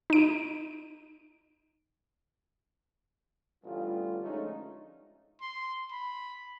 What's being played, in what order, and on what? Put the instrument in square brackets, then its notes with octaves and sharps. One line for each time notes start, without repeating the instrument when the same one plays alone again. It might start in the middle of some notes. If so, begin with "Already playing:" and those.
[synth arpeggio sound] D#4 D7
[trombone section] A1 D3 G3 B3 F4
D3 F3 G#3 A3 C#4 D#4
[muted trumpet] C6
B5